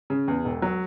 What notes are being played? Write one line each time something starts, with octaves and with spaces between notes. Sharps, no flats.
C#3
E2
E1
F#3